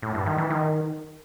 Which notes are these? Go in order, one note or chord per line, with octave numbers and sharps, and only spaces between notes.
A2
G2
D#3
E3
D#3